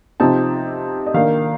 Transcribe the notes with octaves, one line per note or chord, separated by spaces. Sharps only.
C3 F3 C4 D#4 A5
D#5
D#3 A#3 D4 F5